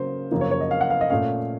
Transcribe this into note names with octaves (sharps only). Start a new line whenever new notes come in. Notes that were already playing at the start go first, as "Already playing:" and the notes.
Already playing: C#3 F#3 A#3 A#4 C5
F#2 C#3 F3 A#3
C#5
C#5
D#5
F5
F#5
F5
D#5
A#2 A3 C#4 F5